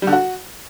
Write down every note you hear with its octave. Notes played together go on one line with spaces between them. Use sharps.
G3
D3
F#4